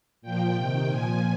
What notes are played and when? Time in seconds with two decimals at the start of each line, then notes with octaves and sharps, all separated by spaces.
0.22 A#2 F3 G5
0.55 C3 D#3
0.88 A#2 F3 G#5